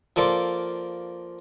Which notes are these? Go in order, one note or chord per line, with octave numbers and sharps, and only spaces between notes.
F3 A#3 A4 D5 C6